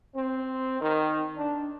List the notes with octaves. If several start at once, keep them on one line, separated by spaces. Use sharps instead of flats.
C4
D#3
D4